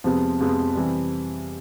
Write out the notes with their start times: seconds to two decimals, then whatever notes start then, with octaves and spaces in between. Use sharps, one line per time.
0.04 F2 C3 F3 G#3 B3
0.40 F2 C3 F3 G#3 B3
0.75 C3 E3 G3